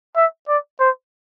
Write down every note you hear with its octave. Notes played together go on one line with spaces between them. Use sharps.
E5
D5
C5